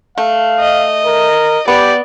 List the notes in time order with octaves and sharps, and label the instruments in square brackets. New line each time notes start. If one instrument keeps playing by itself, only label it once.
[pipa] A3 [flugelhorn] F5
[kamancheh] D#5
[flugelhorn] A#4
[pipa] B3 [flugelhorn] G4 [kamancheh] D5